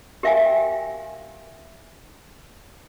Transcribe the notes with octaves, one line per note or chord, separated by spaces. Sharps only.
G4 A#4 E5 F5 G5 G#5